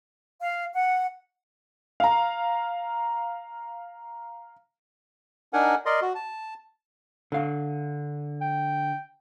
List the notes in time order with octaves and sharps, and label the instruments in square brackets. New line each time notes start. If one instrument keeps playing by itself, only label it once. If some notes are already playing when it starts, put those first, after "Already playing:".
[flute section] F5
F#5
[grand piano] F5 A#5
[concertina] D4 D#4 A#4 F#5 G#5
A#4 D5 D#5 C6
F#4
A5
[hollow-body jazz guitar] D3 F5
[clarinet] G5